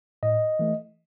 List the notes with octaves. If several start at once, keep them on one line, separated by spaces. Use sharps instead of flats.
A2 D#5
E3 A3